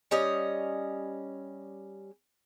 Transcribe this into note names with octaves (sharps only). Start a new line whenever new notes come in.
G3 C#4 D#5